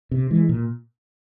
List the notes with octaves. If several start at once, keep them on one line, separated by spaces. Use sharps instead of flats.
C3
E3 G#3
A#2